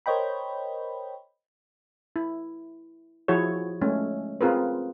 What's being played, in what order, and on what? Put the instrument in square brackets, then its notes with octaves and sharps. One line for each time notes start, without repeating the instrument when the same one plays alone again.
[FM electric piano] A#4 C5 C#5 D#5 G5 B5
[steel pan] E4
F3 E4 F#4 G#4 C#5
G#3 A3 C#4
C4 F4 G#4 A#4 B4